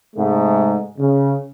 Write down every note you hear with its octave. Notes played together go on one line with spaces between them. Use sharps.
G#2 C3 G#3 A3
C#3